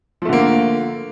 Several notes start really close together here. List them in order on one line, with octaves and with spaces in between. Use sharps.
F3 A3 D3 A#3